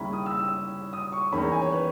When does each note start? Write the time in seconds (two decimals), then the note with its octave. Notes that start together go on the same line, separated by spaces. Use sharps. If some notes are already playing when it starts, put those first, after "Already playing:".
Already playing: D#2 C#3 G3 C#4 E4 A#5 B5
0.13 D#6
0.26 E6
0.39 E6
0.93 D#6
1.12 C#6
1.32 E2 D#3 A#3 C#4 B5
1.42 A#5
1.52 G#5
1.62 C#5
1.72 B4